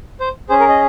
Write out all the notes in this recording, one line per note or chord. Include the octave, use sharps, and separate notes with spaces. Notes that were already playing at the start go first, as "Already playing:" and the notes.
C5
C#4 G#4 C5
A#4
D#5